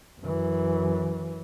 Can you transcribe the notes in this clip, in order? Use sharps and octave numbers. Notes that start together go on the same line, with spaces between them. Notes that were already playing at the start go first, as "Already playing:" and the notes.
F#2 E3